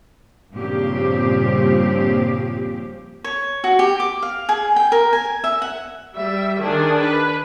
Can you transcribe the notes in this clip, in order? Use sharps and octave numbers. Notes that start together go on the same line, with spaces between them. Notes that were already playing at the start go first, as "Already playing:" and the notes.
G2 A#2 C#3 F3 C4 G4
C#5
F#4
G4
D6
F5
G#4
G5
A#4
G#5
E5
F#5
G3 E5
D#3 D4 G#4
B4